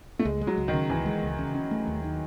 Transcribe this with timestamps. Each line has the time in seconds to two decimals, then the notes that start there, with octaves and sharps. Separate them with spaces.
0.19 A3
0.25 C#2 G#3
0.41 G#3
0.47 F#3
0.58 C#2
0.68 D#3
0.73 C#3
0.90 C#2 E3
1.06 G#3
1.23 C#2
1.39 C#3
1.55 C#4
1.71 A3
1.87 D#2
2.04 D#3